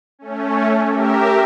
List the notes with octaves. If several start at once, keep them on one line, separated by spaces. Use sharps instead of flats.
A3 C#4
G4 A#4 E5